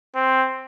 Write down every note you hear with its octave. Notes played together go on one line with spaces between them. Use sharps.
C4